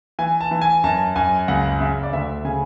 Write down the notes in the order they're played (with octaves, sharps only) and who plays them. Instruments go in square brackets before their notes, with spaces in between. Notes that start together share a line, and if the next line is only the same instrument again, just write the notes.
[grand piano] E3 G#5
A5
E3
G#5
F#2 A5
F#2 G#5
C#2 F#5
C#3 E5
D5
D2 E5
C#3 G#5